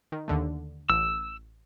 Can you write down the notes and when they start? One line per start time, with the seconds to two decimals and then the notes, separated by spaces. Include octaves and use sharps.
0.12 D#3
0.28 D#2 D3 A3
0.90 A1 E6